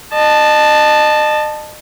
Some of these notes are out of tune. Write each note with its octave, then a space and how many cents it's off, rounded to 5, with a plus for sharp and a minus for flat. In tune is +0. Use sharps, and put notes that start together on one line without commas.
D#5 -35 A5 +0